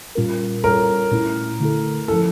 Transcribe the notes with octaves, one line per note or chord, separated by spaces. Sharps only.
A#2 G3 C#4 F4 A#4
G3 C#4 F4 A4 A#4 C#5
A#2 A3 C#4 E4
D3 A3 E4 A4
F3 C#4 E4 A4